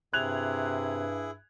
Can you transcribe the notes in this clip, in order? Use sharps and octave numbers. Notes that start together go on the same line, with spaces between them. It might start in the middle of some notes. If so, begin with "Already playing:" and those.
G2 C3 E4 G#4 F#6 G#6 F7